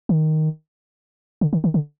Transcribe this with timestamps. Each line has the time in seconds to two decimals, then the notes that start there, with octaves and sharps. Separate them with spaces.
0.09 D#3
1.41 D3
1.53 D#3
1.64 D#3
1.74 D3